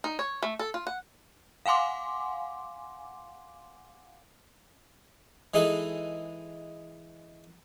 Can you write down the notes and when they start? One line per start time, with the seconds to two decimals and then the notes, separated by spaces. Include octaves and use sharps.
0.04 D#4
0.19 C#5
0.43 A3
0.59 A4
0.74 F4
0.87 F#5
1.66 F5 F#5 G#5 C6 D6
5.54 E3 G#3 D#4 G#4 A4 B4